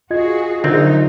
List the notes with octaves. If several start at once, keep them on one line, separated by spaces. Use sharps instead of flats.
F4 F#4 G#4 D#5 G#6
A#1 D3 F#3 C4 D#4